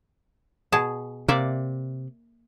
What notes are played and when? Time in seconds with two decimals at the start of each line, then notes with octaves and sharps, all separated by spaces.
0.72 B2 G#4 A5
1.28 C3 A#3 D5 E5